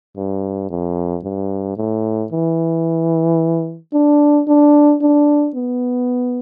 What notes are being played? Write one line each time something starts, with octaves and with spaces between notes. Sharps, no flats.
G2
F2
G2
A2
E3
D4
D4
D4
B3